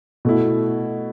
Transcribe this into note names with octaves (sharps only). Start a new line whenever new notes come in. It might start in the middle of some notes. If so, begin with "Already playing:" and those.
B2 A3 E4